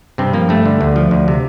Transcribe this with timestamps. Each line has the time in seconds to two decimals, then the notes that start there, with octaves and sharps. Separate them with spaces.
0.18 G2 C3 C4
0.33 F3 A#3
0.49 G2 A3
0.66 D3
0.81 D2
0.96 F3
1.11 D2
1.28 C3